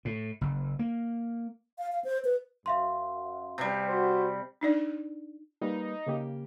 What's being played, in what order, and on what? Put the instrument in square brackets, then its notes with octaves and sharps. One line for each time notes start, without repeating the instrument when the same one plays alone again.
[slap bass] A2
F#1
A#3
[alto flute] F5
F5
C5
B4
[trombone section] F#2 [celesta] E5 F5 C6
[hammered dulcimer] C3 G3
[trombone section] F#4 [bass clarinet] C5
[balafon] D4 D#4 D5
[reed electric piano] G3 A#3 B4 [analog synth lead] D#4
[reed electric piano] C#3 A#3 G4